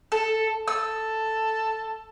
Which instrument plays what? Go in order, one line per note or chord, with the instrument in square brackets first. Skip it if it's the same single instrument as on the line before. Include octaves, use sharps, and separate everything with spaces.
[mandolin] A4
[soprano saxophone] A4 [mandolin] E6